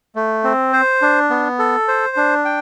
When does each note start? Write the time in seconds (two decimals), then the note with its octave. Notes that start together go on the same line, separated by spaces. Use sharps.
0.15 A3
0.44 C4
0.73 C5
1.02 D4
1.30 B3
1.59 A4
1.88 C5
2.17 D4
2.45 G5